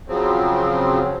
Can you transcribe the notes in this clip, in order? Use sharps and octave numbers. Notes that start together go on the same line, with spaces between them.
C#3 F3 F#3 C4